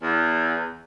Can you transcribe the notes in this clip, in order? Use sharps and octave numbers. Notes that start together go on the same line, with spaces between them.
E2